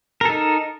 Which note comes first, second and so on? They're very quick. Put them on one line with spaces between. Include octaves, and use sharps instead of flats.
A#4 A4 D#4